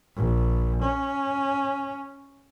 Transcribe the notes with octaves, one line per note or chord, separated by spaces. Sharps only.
A#1
C#4